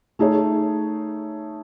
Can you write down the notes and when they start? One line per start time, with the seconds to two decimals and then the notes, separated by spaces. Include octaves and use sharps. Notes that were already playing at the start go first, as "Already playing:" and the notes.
0.19 A3 D#4 G#4 C#5